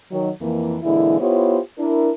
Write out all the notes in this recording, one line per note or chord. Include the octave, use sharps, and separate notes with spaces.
D#3 F#3
F2 E3 A#3
A#2 D3 E3 G#3 E4
B3 E4 F4 G4 C5 C#5
D4 E4 A#4